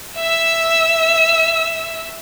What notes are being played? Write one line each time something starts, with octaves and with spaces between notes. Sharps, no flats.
E5 E6